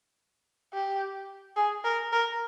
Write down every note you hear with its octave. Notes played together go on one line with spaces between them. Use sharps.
G4
G#4
A#4
A#4